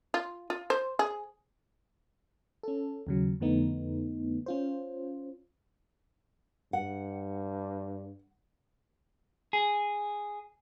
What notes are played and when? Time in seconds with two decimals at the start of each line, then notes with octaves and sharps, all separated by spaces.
0.14 F4
0.50 F4
0.70 C5
0.99 G#4
2.63 C#4 A4
3.07 D#2 C#3 F#3
3.40 F2 D3 A3 B3 D#4
4.46 C#4 F4 C5
6.73 G2 F#5
9.53 G#4